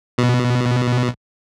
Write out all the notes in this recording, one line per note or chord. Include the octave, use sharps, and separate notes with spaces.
B2